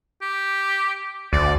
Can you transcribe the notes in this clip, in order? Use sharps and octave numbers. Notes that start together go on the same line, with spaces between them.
G4
D2 D5